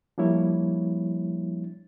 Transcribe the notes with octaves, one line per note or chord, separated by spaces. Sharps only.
F3 G3 A#3 D4 E4 C#5